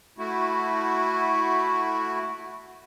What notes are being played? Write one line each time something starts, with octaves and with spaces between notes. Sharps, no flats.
A3 E4 F#4